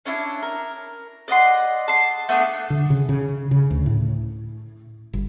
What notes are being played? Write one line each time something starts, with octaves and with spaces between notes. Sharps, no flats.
C#4 D4 E4
A#4
D5 D#5 F#5 C6
A5 C6
A3 B3 D4 A4
D3
C#3
C#3
C#3
D2
A2
G1